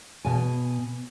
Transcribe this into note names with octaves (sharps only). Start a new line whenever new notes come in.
B2 G#5